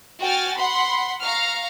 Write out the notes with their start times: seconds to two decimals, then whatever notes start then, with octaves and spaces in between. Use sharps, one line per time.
0.21 F#4 G5 G#5 F6 A6
0.55 F#5 B5 C6
1.21 F5 A#5 C#6 F6